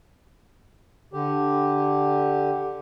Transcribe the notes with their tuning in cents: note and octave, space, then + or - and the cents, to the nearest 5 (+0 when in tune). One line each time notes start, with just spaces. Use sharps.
D3 +0 G4 +0